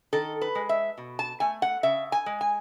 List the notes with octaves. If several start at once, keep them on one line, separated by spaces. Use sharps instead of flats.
D#3 A4
B4
G#3
E5
B2
A5
A3 G#5
F#5
C#3 E5
G#5
G#3
G#5